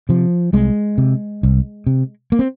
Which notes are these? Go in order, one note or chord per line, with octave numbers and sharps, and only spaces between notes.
C3 F3
C2 G#3
C3
C2
C3
A#3
C4